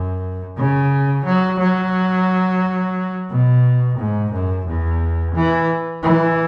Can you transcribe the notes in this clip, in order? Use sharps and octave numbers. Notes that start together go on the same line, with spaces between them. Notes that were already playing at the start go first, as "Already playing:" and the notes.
Already playing: F#2
C#3
F#3
F#3
B2
G#2
F#2
E2
E3
E3